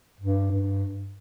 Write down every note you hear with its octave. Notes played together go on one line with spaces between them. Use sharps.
G2
G2